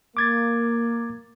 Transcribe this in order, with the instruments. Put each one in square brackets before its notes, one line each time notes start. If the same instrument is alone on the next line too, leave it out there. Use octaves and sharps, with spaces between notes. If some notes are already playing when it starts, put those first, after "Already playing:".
[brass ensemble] A#3 [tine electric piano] D6 G#6 A6